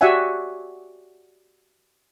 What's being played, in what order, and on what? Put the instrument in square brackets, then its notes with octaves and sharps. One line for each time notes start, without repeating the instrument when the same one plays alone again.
[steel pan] F#4 G4 D5 E5 F#5 G#5